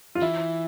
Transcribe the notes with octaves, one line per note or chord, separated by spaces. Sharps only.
F4
E3 E4